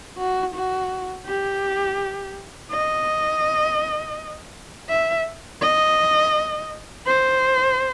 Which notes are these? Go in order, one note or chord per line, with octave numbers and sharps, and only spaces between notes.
F#4
F#4
G4
D#5
E5
D#5
C5